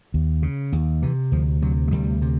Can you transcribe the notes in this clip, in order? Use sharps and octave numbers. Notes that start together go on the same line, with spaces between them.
D#2
C#3
D#2
C3 E3
D2 F3
C3 F#3
G#3
D2 G3
C3